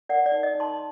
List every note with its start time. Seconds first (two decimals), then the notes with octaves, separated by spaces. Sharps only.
0.09 A#4 D5 F#5
0.26 D5
0.32 D#4
0.43 D#5
0.55 D#4
0.60 A5 C6